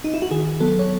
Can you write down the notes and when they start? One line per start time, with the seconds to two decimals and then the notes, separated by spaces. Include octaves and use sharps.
0.04 D#4
0.14 E4
0.22 F#4
0.31 D#3 G#4
0.60 F#3 B3 A4
0.79 C#5